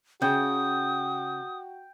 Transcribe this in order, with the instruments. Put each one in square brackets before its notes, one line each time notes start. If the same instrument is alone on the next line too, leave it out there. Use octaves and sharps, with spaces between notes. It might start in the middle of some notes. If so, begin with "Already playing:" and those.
[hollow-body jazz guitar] C#3 [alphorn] F#4 [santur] G5 [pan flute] D#6